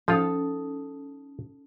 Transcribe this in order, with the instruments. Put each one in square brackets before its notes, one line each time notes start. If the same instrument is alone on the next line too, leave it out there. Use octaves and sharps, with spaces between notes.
[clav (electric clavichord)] F3 F4 [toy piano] C#4 D#4 D#6 [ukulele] A4